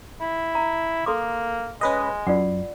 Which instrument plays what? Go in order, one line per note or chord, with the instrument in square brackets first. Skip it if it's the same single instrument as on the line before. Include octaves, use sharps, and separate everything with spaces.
[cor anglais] E4
[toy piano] A#5
[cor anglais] A#3 [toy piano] A4 C6 D6
[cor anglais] G#3 [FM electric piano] C#4 B4 D#5
[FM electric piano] F#2 [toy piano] F4 D5 F#5